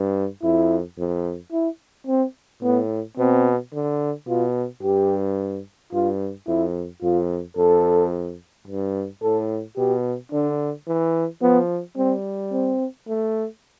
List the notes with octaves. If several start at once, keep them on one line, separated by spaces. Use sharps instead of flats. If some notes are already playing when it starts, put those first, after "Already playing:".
Already playing: G2
F2 E4
F2
E4
C4
A2 B3
B2 C4
D3
B2 F4
G2 G4
G2 F4
F2 E4
F2 F4
F2 A4
G2
A2 A4
B2 G4
D3 D4
E3
F3 B3
G3 C4
C4
A3